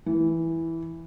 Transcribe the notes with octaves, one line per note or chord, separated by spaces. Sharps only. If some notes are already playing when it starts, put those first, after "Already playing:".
E3